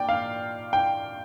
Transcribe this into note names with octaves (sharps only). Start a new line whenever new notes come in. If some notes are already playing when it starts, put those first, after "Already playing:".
Already playing: A#2 D5 G5
F5
G5